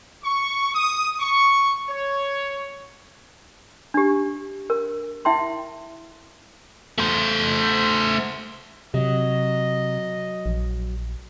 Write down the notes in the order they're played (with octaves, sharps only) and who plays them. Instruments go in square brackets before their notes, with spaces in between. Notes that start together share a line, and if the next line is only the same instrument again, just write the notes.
[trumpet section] C#6
D#6
C#6
C#5
[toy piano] D4 G4
A#4
E4 E5 G5 C6
[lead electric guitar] A3 C5
[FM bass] C3 [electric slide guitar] F#3 [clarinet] D#5
[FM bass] A#1